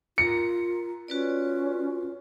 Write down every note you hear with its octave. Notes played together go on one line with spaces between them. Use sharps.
F4 A#4 A#5 C#7
C#4 F4 F#4 B4 D5